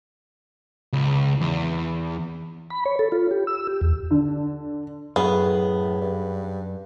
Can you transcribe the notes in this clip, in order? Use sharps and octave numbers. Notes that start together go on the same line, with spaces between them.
C#2
E2
B5
C#5
A4
F4
G4
E6
G4
E2
D3 D4
F#2 A2 B3 G#4
G2